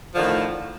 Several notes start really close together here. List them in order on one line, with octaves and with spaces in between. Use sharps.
F3 D3 D#3 A2